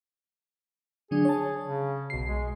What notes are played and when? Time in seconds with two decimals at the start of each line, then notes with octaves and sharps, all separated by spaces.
1.11 D3 F#3 D4 G#4
1.25 C#5 A5
1.65 C#3
2.10 B1 B2 C7
2.28 G#3